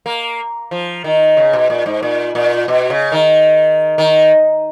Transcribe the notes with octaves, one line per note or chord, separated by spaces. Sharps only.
A#3
F3
D#3
C#3
B2
A#2
G#2
A#2
A#2
B2
C#3
D#3
D#3